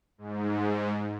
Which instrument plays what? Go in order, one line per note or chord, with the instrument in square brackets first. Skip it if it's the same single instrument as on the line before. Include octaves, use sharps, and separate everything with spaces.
[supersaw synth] G#2